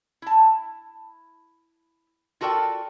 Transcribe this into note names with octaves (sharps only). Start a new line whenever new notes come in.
E4 A5
F4 F#4 A4 A#4 D5 G5